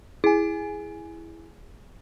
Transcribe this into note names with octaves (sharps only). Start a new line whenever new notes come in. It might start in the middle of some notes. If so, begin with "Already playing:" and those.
E4 G#4 G#5